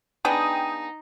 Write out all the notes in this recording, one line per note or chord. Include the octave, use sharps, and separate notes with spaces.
B3 D4 D#4 G#4 G5 D#6